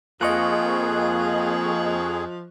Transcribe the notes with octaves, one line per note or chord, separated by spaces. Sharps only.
F2 F3 A#3 G#4 D#5 C#6 F#6